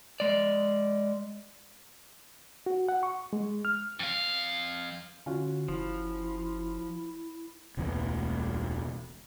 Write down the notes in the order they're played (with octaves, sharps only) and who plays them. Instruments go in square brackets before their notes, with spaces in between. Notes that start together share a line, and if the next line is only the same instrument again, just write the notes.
[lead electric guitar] G#3 D5
[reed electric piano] F#4
F#5
C#6
G#3
F6
[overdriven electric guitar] F2 F5
[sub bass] D3 [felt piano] C#4 F4 F#4
[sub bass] F#1 [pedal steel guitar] F3 [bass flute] E4
[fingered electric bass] E1 C#2 E3